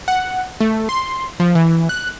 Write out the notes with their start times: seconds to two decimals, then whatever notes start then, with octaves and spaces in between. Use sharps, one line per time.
0.08 F#5
0.60 A3
0.89 C6
1.40 F3
1.55 E3
1.89 F#6